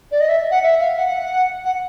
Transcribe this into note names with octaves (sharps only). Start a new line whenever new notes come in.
D5
D#5
E5
F#5
E5
F5
F#5
F#5